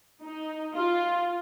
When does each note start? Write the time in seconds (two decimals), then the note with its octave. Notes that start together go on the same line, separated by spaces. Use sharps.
0.21 D#4
0.74 F4